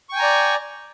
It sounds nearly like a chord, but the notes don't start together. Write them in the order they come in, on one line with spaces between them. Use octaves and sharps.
C#6 G5 G#5 A#5 D5